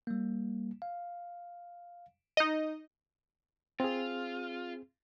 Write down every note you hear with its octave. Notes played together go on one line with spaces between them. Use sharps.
G3 A#3
F5
D#4 D#5
C4 F4 G#4